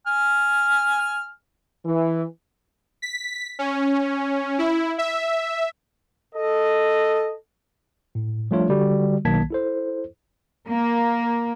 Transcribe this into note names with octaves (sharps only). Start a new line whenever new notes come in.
G#5 F6
E3
B6
C#4
E4
E5
A4 D#5
A2
F3 G3 A3 D4 F4 C#5
D3 G3 F#4
B1 D#3 A#3 A5 G#6 B6
E4 A4 C5
A#3